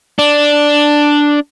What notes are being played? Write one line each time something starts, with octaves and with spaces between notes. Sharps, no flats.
D4